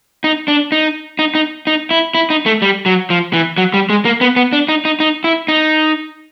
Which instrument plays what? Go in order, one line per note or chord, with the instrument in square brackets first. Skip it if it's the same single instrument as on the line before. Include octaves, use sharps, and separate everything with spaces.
[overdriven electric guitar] D#4
D4
D#4
D#4
D#4
D#4
E4
E4
D#4
A3
G3
F#3
F3
E3
F#3
G3
G#3
A#3
B3
B3
D4
D#4
D#4
D#4
E4
D#4